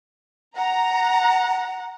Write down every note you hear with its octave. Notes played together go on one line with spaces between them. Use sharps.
F#5 A#5